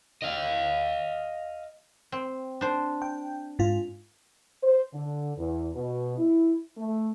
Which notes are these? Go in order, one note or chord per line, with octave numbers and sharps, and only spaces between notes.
D#5 F5
C4
D4 C5
G5
G#2 F4
C5
D3
E2
B2
E4
A3